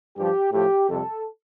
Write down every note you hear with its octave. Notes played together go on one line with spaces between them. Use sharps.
G2 F3 G4
A2 F3 G4
F2 C3 G3 A4